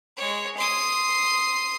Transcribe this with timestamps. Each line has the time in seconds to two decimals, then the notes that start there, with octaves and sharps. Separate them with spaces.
0.17 G#3 C#5
0.57 C6 D#6